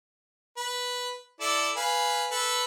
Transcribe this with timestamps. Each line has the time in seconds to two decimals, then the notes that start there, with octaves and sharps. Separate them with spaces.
0.57 B4
1.40 E4 A4 D5
1.76 B4 F5 G#5
2.31 A4 B4